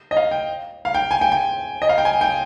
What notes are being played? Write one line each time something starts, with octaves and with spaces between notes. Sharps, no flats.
D#5
F5
G5
F5
G5
G#5
G5
G5
D#5
F5
G5
G#5
G5